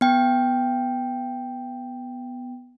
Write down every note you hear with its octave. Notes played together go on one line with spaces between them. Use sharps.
B3 G5